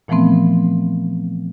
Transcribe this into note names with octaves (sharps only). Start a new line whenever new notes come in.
A#2 E3 F3 A3 B3 C4